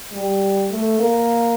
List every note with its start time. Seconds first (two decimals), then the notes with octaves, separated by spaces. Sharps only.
0.12 G3
0.70 A3
0.99 A#3